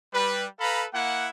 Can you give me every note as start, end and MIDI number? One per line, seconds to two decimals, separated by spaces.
0.14 0.46 55
0.14 0.46 71
0.60 0.86 69
0.60 0.86 71
0.60 0.86 77
0.60 0.86 82
0.60 0.86 83
0.94 1.29 58
0.94 1.29 64
0.94 1.29 78